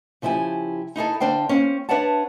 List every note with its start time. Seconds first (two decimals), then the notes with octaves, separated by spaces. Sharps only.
0.22 C#3 F3 E4 G4 G#5
0.96 D#4 E4 G#4 A4
1.20 D3 D4 C5 F5 G5
1.49 A#3 C4 C#4
1.89 D4 B4 C#5 E5 F#5 A5